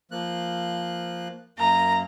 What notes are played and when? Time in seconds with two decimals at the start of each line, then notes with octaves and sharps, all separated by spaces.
0.11 F3 A#3 F#6
1.58 F#2 A#3 A#5